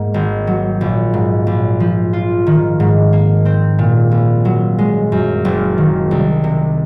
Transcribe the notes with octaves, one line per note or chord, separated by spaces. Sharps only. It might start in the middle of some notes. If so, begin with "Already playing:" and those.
Already playing: G#2 A#3
G#1
F#3
A#1
G#2
A#1
F3
F4
D#3
G#2
A#3
C4
A#2
A#1
F#3
G#3
F#2
F#1
D#3
C2
C3